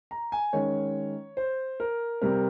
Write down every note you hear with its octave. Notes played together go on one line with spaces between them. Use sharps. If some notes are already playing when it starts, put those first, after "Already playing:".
A#5
G#5
D#3 G#3 C#4 C#5
C5
A#4
C3 G3 C4 A#4